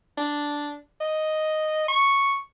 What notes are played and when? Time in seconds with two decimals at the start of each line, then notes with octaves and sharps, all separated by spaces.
0.18 D4
1.01 D#5
1.88 C#6